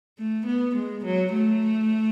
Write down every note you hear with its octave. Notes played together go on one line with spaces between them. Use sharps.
A3
B3
G#3
F#3
A3